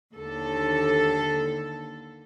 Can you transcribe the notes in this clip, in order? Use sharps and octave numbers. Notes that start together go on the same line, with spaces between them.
D#2 D3 A4